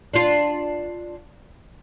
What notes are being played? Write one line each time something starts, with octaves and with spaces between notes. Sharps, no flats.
D4 F4